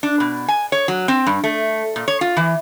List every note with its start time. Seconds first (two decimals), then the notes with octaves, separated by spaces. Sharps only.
0.03 D4
0.20 B2
0.48 G#5
0.72 C#5
0.88 F#3
1.08 C4
1.27 G2
1.44 A3
1.96 A#2
2.08 C#5
2.21 F4
2.37 E3